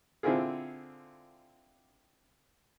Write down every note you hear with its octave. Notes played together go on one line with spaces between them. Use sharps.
D3 C4 E4 F4 G#4